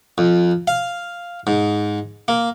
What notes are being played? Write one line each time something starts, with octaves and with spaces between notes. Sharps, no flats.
F2
F5
G#2
A#3